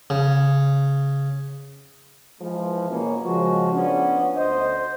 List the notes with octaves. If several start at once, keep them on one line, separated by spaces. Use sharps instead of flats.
C#3
E3 F3 G#3
B2 A#3 C#4
C#3 F3 G#3 F#4
F3 B3 C#4 D4
D2 C5 D#5